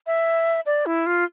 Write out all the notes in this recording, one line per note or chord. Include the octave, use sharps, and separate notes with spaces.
E5
D5
E4
F4